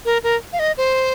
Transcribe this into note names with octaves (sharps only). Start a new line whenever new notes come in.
A#4
A#4
F5
D#5
C5